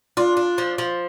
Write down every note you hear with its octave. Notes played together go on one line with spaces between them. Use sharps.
D4 F4
D4
F3
F3